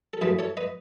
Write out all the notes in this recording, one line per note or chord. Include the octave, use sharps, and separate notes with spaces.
A4
F#2 E3 A3 G#4 B4
A4 C#5
B4 D#5